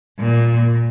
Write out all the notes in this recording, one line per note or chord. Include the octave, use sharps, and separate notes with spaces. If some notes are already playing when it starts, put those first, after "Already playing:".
A#2